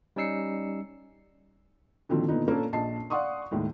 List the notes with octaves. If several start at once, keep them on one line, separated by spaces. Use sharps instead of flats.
G3 C#4 D#4 E6 C7 C#7
A#2 D3 D#3 F3 F#3 C4
A#2 D3 B3 D#4
A#2 A#3 C#4 D4 A4
A#1 D#5 A5 C7
D5 F5 F#5 C6 C#6 D#6
D#2 A2 D#3 G#3